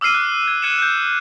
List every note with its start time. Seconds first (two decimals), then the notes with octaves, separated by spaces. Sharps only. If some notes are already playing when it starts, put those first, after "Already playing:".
0.01 D6 E6 F6 C7 D#7
0.14 F#6
0.48 G#6
0.62 F#6 G#6 C#7 D#7 E7
0.78 F#6 G6